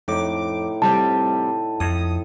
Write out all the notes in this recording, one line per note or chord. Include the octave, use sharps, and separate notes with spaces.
F2 A2 D#4 D6
C3 G3 C4 A5
F2 A4 D#6